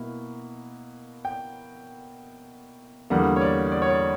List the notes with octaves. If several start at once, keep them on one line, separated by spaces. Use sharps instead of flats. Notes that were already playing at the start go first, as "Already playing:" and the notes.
Already playing: B2 A#3 E4
G5
E2 D3 G3 A#3 F#5
C#5
D5
D5
C#5
D5